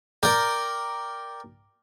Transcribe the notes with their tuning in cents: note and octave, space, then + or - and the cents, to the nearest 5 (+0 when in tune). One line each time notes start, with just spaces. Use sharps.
A#4 +0 D5 +0 G5 +0